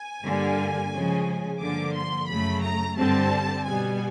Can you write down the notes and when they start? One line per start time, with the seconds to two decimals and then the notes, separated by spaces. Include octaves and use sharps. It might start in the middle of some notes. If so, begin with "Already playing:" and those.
Already playing: G#5
0.23 G2 D3 G3 A#3
0.92 C#3 F3 G#3 C#4
1.60 G2 D3 F3 A#3 D6
1.95 C6
2.28 F#2 C#3 F#3 A3 B5
2.63 A#5
2.97 G2 D3 G3 C4 A5
3.66 B2 G3 B3 G#5